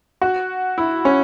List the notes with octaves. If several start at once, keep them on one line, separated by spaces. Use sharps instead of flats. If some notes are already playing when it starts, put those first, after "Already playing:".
F#4
E4
C#4